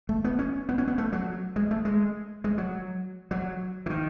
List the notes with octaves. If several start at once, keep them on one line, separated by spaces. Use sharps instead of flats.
A3
B3
C#4
B3
C#4
B3
A3
F#3
G#3
A3
G#3
G#3
F#3
F#3
E3
D#3